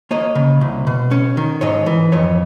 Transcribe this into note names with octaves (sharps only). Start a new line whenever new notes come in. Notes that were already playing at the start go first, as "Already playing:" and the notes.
A#3 C#5 D#5
C#3
C2
B2
C#4
D#3
G#2 C#5 D#5
E3
F2 C#5 D#5